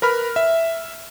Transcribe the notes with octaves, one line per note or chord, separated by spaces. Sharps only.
A#4 B4 B5 F6
E5